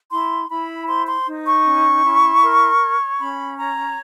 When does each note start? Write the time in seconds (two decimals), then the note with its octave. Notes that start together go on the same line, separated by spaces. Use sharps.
0.10 E4 C6
0.49 E4 B5
0.88 C5 C6
1.07 C6
1.27 D#4
1.45 C#6
1.65 C#4
2.03 E4
2.42 A#4
2.80 C#5
3.19 C#4 B5
3.57 C#5 A#5